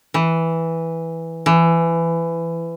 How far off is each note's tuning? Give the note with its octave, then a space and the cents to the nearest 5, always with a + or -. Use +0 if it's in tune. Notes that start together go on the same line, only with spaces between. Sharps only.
E3 -5
E3 +20